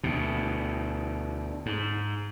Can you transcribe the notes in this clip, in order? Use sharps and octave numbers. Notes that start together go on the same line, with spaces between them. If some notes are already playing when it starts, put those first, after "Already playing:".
D2 B2
G#2